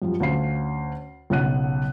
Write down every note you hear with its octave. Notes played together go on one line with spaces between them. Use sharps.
F#2 F3 G3
D2 C#4 F5 C7
B1 C#3 C#5 F#5 F#6 D#7